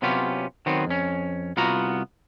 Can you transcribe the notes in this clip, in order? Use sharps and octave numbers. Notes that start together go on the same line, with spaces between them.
C3 F#3 B3 C#4 F4 G4
D#3 F#3 B3 C4
F2 C#4
C2 B3 F4 F#4 A#5